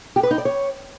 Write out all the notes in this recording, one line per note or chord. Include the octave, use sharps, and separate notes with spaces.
G4
B4
D#4
D5
C#5